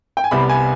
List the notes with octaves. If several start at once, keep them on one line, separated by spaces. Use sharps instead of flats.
G5
G#5
C2 C3 G3 B3 B5
G#5